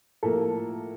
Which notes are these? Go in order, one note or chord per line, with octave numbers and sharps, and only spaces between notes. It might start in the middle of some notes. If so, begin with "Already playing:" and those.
A2 F3 A#3 A4